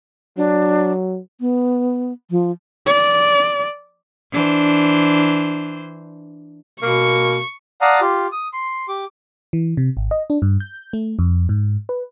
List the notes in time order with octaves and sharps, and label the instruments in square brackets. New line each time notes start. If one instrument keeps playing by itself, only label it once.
[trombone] F#3 [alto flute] D4
[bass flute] B3
F3
[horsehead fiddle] D5
[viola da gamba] E3 D4 C5
[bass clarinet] B2 [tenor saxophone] A#3 [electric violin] C#6
[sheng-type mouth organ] D5 F5 F#5 A5 A#5 D#6
F4 G4
D#6
C6
G4 D6
[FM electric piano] E3
C3
G#1
D#5
D4
G2
G6
A3
F2
G#2
B4